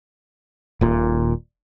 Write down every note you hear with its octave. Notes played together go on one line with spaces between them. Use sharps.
D#1 A#2